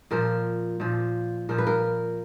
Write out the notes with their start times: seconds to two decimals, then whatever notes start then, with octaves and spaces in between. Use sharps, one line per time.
0.11 A#2 F3 A#4
0.80 A#2 F3
1.49 A#2 F3 A#4
1.58 B4
1.67 A#4